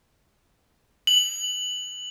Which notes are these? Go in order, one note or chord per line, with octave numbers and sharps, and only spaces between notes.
F#7